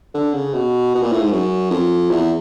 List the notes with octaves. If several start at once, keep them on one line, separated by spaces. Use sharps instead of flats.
D3
C#3
B2
B2
A#2
A2
G#2
F#2
F2
E2